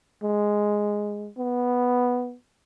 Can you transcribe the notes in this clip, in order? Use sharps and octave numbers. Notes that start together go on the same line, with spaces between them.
G#3
B3